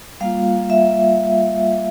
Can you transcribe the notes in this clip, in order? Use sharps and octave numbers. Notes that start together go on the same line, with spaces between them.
G3 A#3 F4 F5
E5